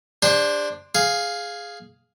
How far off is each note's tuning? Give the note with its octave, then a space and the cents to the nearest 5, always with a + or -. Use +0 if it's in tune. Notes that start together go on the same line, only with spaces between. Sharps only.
D4 +0 G4 +40 C5 +0
G#4 +0 F5 +5